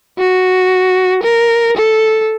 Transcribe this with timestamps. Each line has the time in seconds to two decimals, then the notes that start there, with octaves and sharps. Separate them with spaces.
0.19 F#4
1.23 A#4
1.77 A4